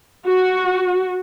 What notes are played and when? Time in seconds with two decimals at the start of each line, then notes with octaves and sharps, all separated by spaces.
0.25 F#4